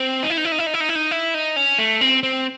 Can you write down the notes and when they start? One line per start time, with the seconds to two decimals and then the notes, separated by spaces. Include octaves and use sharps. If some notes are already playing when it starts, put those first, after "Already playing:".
Already playing: C4
0.23 D#4
0.30 E4
0.38 D#4
0.45 E4
0.52 D#4
0.59 E4
0.67 D#4
0.74 E4
0.81 D#4
0.89 E4
0.95 D#4
1.11 E4
1.34 D#4
1.56 C#4
1.79 A3
2.01 C4
2.23 C4